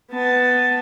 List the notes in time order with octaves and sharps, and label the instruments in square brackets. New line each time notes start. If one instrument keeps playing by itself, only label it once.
[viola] B3 A5